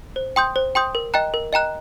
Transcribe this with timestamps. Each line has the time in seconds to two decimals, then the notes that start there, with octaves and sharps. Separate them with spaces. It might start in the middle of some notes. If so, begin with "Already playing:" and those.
0.16 C5
0.36 G5 C6 D#6 G6
0.56 C5
0.75 G5 C6 D#6 G6
0.95 A#4
1.14 D#5 G5 A#5 F#6
1.34 A#4
1.53 D#5 G5 A#5 F#6